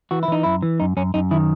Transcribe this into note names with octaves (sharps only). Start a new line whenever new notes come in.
E3 F#4
E4
E3 D#4
F#2 E4
E3
F#2 D#4
F#2 C#4
F#2 D#4
D#3 E4